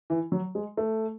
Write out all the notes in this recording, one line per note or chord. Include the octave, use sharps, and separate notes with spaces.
E3
F#3
G#3
A3